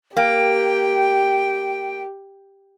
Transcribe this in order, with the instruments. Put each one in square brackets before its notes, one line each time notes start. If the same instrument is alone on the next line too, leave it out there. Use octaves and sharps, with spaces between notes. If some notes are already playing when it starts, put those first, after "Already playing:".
[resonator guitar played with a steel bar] A#3 [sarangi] G4 [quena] G5